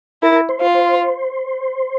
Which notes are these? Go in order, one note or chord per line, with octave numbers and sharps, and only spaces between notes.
E4 A#4
C5
F4
C5